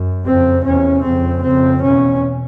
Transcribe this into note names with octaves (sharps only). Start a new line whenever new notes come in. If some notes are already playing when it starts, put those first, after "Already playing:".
Already playing: F#2
F2 C#3 C4
E2 C3 C#4
F2 C#3 C4
F2 C#3 C4
E2 B2 C#4